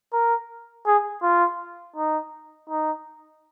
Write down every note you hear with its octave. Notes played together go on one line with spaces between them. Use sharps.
A#4
G#4
F4
D#4
D#4